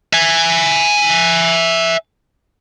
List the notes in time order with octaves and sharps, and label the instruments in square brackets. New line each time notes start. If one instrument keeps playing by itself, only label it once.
[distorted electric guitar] E5 G#5